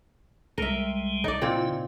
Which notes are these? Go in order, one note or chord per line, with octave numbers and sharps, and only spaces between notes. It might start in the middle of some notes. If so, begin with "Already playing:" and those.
C2 G3 G#3 A#4 E5
D#4 D5
A#2 C#3 C4 E4